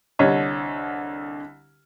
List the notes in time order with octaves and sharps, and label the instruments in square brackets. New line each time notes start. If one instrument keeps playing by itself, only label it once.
[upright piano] C2 D3 C#5 D#5